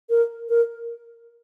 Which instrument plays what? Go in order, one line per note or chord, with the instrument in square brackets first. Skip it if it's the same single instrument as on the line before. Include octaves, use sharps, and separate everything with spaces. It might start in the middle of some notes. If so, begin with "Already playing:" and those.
[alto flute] A#4
A#4